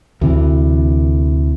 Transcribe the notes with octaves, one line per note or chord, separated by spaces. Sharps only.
D2 C3 E3